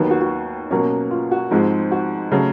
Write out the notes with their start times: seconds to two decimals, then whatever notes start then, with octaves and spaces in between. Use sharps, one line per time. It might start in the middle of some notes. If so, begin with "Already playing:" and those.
Already playing: D#2 D#3 F#3 B3
0.11 F#4
0.21 F#4
0.71 B2 F#3 A#3 C#4
1.11 F4
1.31 F#4
1.51 G#2 F3 G#3 C4
1.91 F#4
2.31 C#3 F#3 A3